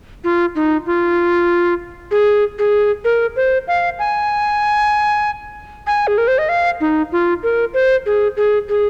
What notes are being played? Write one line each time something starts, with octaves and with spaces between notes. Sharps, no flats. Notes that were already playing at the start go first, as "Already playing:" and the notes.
F4
D#4
F4
G#4
G#4
A#4
C5
F5
G#5
G#5
G#4
A#4
C5
D#5
F5
D#4
F4
A#4
C5
G#4
G#4
G#4